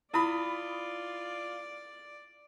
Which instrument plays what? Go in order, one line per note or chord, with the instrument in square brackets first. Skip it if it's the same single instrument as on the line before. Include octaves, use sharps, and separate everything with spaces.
[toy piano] E4 [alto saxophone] F4 [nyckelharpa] D5 [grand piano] B5 D#6